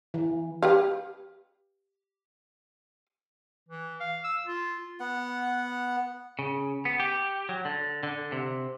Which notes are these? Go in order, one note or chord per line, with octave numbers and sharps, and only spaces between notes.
E3
G4 B4 F5
E3
F5
E6
F4
B3 F#5
C#3
B3
G4
F#3
D3
D3
C3